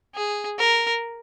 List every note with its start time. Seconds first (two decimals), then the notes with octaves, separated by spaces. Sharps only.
0.15 G#4
0.58 A#4